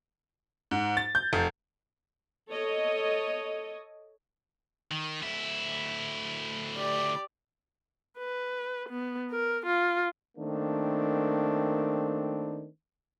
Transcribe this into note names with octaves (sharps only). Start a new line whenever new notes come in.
G#2
A6
G6
F1
A4 C#5 D#5
D#3
D2 E4
G4 D5
B4
B3
A#4
F4
D#3 A3 A#3 C4 D4